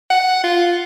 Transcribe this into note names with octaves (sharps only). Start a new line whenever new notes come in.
F#5
F4